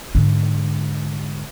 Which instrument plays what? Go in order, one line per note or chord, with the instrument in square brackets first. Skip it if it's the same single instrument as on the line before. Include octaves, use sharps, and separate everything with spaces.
[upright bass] G#2 D3